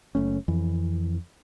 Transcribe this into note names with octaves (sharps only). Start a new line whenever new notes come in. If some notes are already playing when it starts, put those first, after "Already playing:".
F#1 A3 C#4
F2 E3